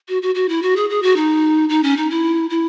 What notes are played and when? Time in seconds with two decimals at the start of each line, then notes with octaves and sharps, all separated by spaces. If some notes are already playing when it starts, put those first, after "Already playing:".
0.09 F#4
0.22 F#4
0.35 F#4
0.49 E4
0.62 F#4
0.76 G#4
0.90 G#4
1.02 F#4
1.16 D#4
1.69 D#4
1.83 C#4
1.97 D#4
2.10 E4
2.50 E4